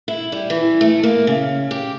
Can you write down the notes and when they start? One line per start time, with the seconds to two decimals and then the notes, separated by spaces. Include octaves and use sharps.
0.08 E4
0.32 G3
0.50 E3
0.81 A3
1.03 A#3
1.27 C#3
1.71 G4